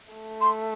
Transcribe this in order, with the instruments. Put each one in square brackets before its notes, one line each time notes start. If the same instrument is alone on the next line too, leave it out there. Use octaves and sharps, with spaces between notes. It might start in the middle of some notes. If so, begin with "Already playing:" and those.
[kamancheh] A3
[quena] C6